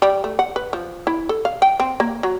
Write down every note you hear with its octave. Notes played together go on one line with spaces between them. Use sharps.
G3
A3
F#5
B4
F3
E4
A4
F5
G5
C4
A#3
F#3